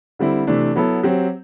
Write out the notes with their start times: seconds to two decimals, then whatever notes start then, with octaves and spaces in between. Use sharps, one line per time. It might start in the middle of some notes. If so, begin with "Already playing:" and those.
0.19 D3 G3 C4 E4
0.47 C3 E3 A3 D4
0.75 F#3 B3 E4 A4
1.03 F#3 C4 G4